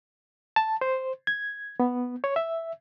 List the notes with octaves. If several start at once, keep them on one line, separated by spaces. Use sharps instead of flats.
A5
C5
G#6
B3
C#5
E5